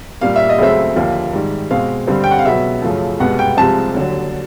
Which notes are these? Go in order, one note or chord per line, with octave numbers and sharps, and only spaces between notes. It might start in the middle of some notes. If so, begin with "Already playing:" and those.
A#2 G3 A#3 F5
E5
D#5
C#2 C#3 F#3 A3 C4 E5
D#2 D3 F3 A#3
G#2 D#3 G3
B2 G#3 C4 F5
G2 D3 G3 C4
G5
F#5
F5
C#2 B2 F#3 B3 E5
F#2 C#3 F3 A3
C2 B2 G#3 B3 F#5
G5
C2 C3 F3 G#3 C4 A5
D#2 D3 F#3